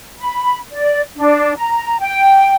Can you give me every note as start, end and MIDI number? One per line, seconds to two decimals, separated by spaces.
0.19 0.58 83
0.72 1.01 74
1.17 1.53 62
1.57 1.97 82
2.00 2.55 79